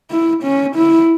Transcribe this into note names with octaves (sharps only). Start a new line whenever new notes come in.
E4
C#4
E4